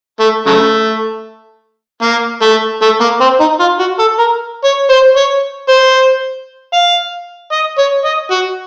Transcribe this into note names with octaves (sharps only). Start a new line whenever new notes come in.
A3
C#3 F#3 A3
A#3
A3
A3
A#3
C4
D#4
F4
F#4
A4
A#4
C#5
C5
C#5
C5
F5
D#5
C#5
D#5
F#4